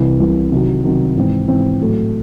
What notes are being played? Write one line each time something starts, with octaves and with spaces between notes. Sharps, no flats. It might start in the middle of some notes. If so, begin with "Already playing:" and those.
Already playing: C2 C3 E3
C2 C3 E3
C3 D#3 F#3
C3 D#3 F#3
G#2 E3 C4
G#2 E3 C4
A2 F#3 A3